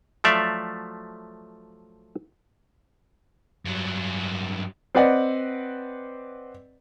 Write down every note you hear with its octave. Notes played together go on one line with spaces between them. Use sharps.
F3 F#3 A3 D5 E5 F5
G2 F#3
C4 B4 D5 D#5 F#5